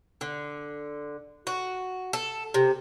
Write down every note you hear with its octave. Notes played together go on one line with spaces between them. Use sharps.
D3
F#4
A4
C3